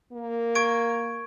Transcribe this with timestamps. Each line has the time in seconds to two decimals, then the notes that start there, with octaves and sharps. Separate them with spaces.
0.12 A#3
0.55 C#6 G#6 D7